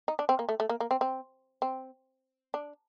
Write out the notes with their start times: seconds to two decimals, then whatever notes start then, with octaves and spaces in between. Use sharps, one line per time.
0.08 D#4
0.19 D4
0.29 C4
0.39 A#3
0.49 A3
0.60 A3
0.69 A#3
0.80 A#3
0.91 C4
1.01 C4
1.62 C4
2.54 D4